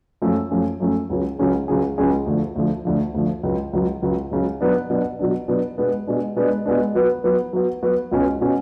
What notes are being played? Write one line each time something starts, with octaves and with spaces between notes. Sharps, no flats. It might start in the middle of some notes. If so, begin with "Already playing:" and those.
F#2 F3 A3 C#4
F#2 F3 A3 C#4
F#2 F3 A3 C#4
C#2 C#3 F#3 C#4 G#4
C#2 C#3 F#3 C#4 G#4
C#2 C#3 F#3 C#4 G#4
C#2 C#3 F#3 C#4 G#4
D2 D3 F3
D2 D3 F3
D2 D3 F3
D2 D3 F3
C#2 C#3 F#3
C#2 C#3 F#3
C#2 C#3 F#3
C#2 C#3 F#3
B2 F#3 B3 D4
B2 F#3 B3 D4
B2 F#3 B3 D4
B2 F#3 B3 D4
B2 G#3 B3 D4
B2 G#3 B3 D4
B2 G#3 B3 D4
B2 G#3 B3 D4
F#3 B3 F#4 B4
F#3 B3 F#4 B4
F#3 B3 F#4 B4
F#3 B3 F#4 B4
C#2 B2 G#3 C#4 F#4
B2 G#3 C#4 F#4